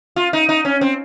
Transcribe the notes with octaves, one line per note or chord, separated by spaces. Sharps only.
F4
D#4
D#4
C#4
C4